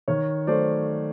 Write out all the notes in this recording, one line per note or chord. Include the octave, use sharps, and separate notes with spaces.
D#3 C#5
F#3 A3 C5 D5